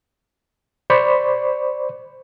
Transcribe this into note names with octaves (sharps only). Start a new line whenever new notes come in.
C5 D5 B5 C#6